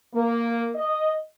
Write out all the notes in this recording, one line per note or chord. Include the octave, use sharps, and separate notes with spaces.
A#3
D#5